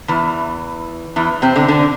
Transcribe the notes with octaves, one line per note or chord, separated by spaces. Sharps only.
E2 E3
E2 E3
C3 C4
D3 D4
D3 D4